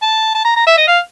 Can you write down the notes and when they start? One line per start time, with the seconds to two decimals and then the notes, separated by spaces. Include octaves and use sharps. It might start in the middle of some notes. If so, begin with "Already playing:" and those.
0.02 A5
0.35 A5
0.45 A#5
0.56 A#5
0.67 E5
0.78 D#5
0.88 F5